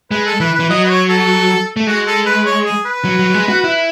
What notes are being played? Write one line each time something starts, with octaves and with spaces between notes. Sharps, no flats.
G#3 B4
A4
E3 B4
E3 B4
F#3 D#5
B4
C#5
A4
A3
G#3 F#4
A4
B4
C#5
G#4
B4
F#3
F#3
F#3
G#3
F#4
E4